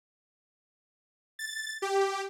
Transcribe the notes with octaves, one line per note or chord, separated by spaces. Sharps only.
A6
G4